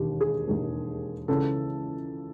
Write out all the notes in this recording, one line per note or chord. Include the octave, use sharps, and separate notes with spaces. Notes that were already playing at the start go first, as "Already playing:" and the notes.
Already playing: E1 D#2 D#3 G4
G#4
E1 D#2 D#3
C#2 C#3 E3 A4